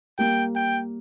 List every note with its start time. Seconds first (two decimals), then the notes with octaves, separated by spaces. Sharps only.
0.18 G3 A#3 G5
0.55 G5